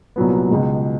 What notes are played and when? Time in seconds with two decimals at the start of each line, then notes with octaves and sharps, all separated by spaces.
0.16 C2 A#2 F#3 B3
0.50 C#2 B2 G#3